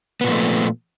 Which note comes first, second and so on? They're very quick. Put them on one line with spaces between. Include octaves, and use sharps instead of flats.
B3 A#2 F3 A3